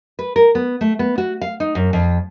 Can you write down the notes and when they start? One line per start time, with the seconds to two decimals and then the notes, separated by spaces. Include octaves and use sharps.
0.19 B4
0.36 A#4
0.55 B3
0.81 A3
0.99 B3
1.18 F#4
1.41 F5
1.60 D#4
1.75 F#2
1.93 F2